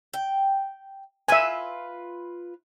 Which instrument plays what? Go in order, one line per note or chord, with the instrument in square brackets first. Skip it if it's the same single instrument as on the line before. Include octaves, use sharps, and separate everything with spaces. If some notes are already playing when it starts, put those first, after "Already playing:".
[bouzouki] G5
[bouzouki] F4 B4 [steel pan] E5 G#5